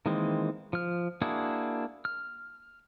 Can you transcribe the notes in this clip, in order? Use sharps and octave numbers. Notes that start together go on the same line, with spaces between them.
D#3 E3 G#3 A#3 C4
F3 F6
A#3 D4 E4 F#4 G#4
F6